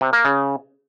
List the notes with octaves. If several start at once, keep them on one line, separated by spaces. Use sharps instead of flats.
C3
A#3
C#3